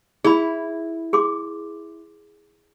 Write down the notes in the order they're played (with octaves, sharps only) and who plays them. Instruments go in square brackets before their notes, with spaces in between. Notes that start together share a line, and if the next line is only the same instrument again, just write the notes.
[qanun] E4 [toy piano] G#4 B5
[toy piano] G#4 C6 D6